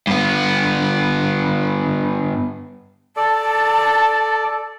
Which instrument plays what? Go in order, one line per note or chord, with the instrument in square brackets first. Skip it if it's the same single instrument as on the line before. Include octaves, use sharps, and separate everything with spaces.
[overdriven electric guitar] G2 B3
[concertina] A4 D5 [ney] A5